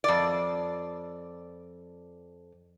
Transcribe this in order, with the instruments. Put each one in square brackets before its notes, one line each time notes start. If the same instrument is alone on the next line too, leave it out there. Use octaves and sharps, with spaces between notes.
[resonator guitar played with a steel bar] F2 D5